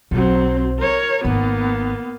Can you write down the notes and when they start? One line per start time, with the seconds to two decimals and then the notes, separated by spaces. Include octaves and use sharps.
0.11 B1 F#3 C4
0.79 A#4 C#5
1.25 G#1 A#3 B3